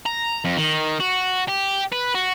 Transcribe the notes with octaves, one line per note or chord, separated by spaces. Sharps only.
A#5
F2
D#3
F#4
G4
B4
F#4